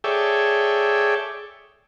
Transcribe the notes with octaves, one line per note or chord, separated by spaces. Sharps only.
G#4 A4 C#5 D5 E5 G5